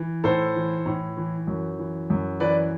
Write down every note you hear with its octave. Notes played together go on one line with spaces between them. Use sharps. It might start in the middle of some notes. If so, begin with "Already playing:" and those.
Already playing: E3
A2 A4 C5
E3
A2
E3
F#2
E3
F#2
E3 B4 D5